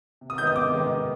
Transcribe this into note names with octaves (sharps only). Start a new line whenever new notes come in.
C3
D#6
D#3 G#3 B3 D#4 G6
D#6
C3 D6
D#3 G#3 B3 D#4